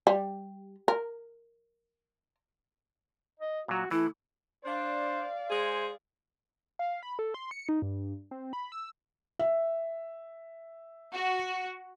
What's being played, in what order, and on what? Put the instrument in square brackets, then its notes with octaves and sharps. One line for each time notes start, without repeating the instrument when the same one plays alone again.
[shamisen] G3
A#4
[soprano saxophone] D#5
[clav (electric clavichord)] A#2 F#3 [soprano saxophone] F#4
[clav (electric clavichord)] E3 [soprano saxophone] A3 [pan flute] E4
[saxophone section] D4 [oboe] C5 [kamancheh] D5 F5
[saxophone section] G#3 G#4 [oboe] C5
[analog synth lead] F5
B5
A4
C6
C#7
D#4
G2
C4
B5
E6
[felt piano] E5
[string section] F#4